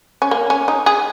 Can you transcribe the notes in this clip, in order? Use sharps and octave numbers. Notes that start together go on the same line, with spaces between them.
C#4
A#3
C#4
D#4
G#4